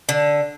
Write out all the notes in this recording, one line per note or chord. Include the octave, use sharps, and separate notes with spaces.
D3